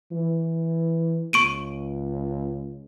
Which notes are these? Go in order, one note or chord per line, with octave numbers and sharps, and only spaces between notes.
E3
C#2 C#6 D7 D#7